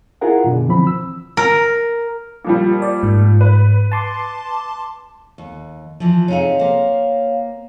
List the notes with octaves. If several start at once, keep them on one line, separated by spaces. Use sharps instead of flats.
E4 F4 G#4 A#4 F#5
F#2 B2 D3
E3 F3 C4 B5
E6
A#4
A#2 F3 G3
D5
G#2
B4
A5 C6 D6
D#2
E3 F3
C3 D#4 G#4 C#5 F5
A#3 C5